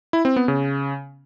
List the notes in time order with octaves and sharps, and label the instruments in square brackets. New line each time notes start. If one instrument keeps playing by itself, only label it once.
[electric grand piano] E4
C4
B3
C#3